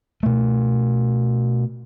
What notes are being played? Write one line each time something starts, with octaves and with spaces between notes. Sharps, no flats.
B2 A3